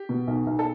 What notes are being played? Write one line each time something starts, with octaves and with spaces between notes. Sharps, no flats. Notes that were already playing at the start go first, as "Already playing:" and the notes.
Already playing: G4
B2
B1
B1
A4